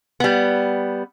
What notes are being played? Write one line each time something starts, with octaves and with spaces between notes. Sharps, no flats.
G3 B3